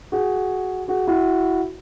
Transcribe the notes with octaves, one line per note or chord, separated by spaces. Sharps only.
F#4 G#4
F#4 G#4
E4 F#4